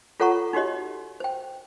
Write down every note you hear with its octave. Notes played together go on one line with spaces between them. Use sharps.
F4 A4 C#5 F#5 A#5 C#6
D#4 F#4 G4 C#5 D#5
C5 G5